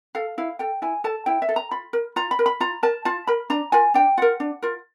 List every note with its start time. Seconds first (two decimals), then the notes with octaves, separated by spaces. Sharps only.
0.15 A4 F5
0.38 E4 F5
0.59 A4 G5
0.82 E4 G#5
1.04 A4 A5
1.26 E4 G5
1.42 E5
1.49 A4
1.56 A#5
1.71 F4 B5
1.93 A#4
2.16 F4 A#5
2.31 B5
2.39 A#4
2.46 B5
2.60 F4 A#5
2.83 A#4 A5
3.05 F4 A5
3.27 A#4 B5
3.50 D4 A#5
3.72 F4 A#4 G#5
3.94 D4 G5
4.17 F4 A#4 F#5
4.40 D4
4.62 F4 A#4